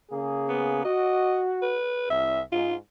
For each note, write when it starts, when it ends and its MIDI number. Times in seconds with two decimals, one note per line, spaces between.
0.11 0.82 49
0.11 0.82 58
0.11 0.82 68
0.49 0.80 59
0.84 1.77 66
0.84 1.40 75
1.62 2.05 71
2.10 2.42 36
2.10 2.41 76
2.52 2.75 44
2.52 2.75 65